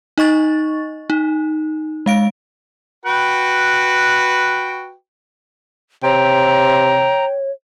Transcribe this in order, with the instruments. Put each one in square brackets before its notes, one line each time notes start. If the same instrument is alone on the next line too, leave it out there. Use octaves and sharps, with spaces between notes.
[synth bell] D#4 D#5 C#6 A6
D#4
G#3 F5 D7
[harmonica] F#4 B4 G5
[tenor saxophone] C3 [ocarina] C#5 [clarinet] G5 [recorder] A#5